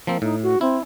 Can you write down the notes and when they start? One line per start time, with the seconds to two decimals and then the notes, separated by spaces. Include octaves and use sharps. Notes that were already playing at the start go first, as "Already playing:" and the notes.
0.07 F3 A#3 C4
0.22 A2 D#4
0.42 F#4
0.61 C4 E4